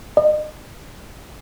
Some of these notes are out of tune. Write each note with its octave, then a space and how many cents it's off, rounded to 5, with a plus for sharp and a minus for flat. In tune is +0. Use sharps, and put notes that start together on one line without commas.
D#5 -40